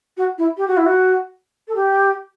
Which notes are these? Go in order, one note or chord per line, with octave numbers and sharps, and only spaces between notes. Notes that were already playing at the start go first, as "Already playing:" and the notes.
F#4
E4
G4
F#4
E4
F#4
A4
G4